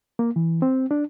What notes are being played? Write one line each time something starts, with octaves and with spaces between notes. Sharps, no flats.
A#3
E3
C4
D4